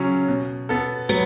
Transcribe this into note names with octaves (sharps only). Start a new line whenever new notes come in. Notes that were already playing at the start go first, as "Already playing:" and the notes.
Already playing: C#3 F#3 C#4
B2
B3 A4
F#3 B3